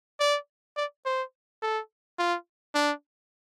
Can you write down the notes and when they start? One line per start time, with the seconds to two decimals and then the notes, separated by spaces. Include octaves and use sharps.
0.20 D5
0.77 D5
1.06 C5
1.63 A4
2.19 F4
2.75 D4